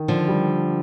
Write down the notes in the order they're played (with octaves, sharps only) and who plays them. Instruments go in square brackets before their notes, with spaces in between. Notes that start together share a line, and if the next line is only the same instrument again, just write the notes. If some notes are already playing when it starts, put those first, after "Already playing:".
Already playing: [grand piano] D#3
[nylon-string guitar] D3 F3
[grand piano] G3